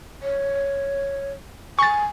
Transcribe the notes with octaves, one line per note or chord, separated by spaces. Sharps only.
C#5
G#5 C#6 A6